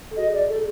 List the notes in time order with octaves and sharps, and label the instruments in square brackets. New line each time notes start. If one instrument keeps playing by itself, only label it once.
[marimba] A4
[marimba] F#4 G#4 [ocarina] D#5
[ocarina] D5
A4
[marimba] G#4